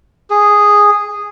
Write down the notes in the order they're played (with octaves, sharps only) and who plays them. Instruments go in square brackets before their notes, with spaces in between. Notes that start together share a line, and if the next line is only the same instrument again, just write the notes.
[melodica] G#4